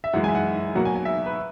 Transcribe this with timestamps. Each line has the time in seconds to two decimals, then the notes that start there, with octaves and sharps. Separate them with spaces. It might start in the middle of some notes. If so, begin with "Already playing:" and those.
0.04 E5
0.13 F#2 E3 G#3 F#5
0.24 G#5
0.29 E5
0.35 F#5
0.75 B2 F#3 A#3 F#5
0.85 G#5
0.95 G#5
1.05 E5
1.26 B4